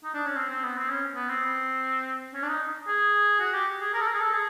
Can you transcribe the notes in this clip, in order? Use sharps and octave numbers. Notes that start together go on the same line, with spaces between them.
D#4
D4
C#4
C4
C4
B3
C4
C#4
B3
C4
C#4
D4
D#4
G#4
F#4
G4
G#4
A#4
A4
A#4
G#4
A4
G#4